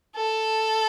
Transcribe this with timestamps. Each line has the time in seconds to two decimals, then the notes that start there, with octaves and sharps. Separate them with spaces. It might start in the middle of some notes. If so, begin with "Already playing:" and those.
0.15 A4